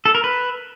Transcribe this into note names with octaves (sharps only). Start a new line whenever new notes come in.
A4
A#4
B4